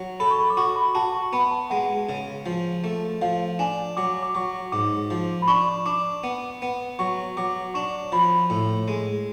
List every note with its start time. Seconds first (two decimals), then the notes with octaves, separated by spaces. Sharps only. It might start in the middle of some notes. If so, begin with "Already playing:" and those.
Already playing: F#3
0.20 A4 B5
0.31 C#6
0.38 B5
0.50 D6
0.57 F#4 C#6
0.76 B5
0.95 F#4 A5
1.15 C#6
1.33 B3 B5
1.51 A5
1.70 G#3 F#5
2.09 C#3
2.46 F3
2.84 A3
3.22 F3 F5
3.59 D4 G#5
3.97 F#3 D6
4.23 D6
4.35 F#3 C#6
4.72 G#2 D6
5.10 F3
5.42 B5
5.48 D4 C#6
5.86 D4 D6
6.24 B3
6.62 B3
6.99 F#3 C#6
7.37 F#3 D6
7.74 D4 C#6
8.12 F3 B5
8.50 A2
8.88 G#3